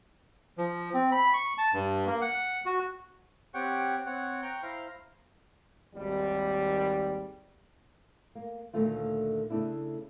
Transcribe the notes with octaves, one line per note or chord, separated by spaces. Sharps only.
F3
C4
B5
C#6
A5
G2
A#3
F#5
F#4
C4 G4 C#5 F#5 G5 C#6
C4 C#5 F#5
G5 A#5 C#6 G6
E4 C5 F5 A#5
G#1 D#2 G3
A#3
D2 A#2 D3 D#3 A3 F4
C#3 A3 D4 E4